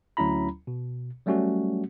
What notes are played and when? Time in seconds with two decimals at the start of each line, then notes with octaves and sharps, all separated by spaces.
0.17 D2 F#3 C#4 E4 A#5 B5
0.67 B2
1.26 F#3 G3 A3 C#4 F#4